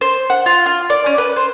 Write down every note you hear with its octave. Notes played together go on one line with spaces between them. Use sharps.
C5
F#5
F4
F4
D5
C#4
B4
C5